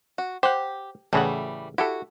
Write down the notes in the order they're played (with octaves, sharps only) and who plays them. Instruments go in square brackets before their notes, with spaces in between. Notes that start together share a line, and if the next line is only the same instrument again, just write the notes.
[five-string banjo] F#4
[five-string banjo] G4 [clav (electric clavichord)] C5 F#5
[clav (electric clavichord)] A1 C#3 F#5 [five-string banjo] E3 G3 A3
[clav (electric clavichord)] E4 G4 A4 [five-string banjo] F#4